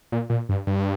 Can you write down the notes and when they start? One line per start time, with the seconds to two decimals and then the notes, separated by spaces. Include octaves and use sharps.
0.12 A#2
0.30 A#2
0.49 G2
0.67 G2